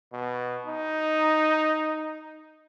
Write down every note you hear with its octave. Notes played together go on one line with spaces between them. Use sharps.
B2
D#4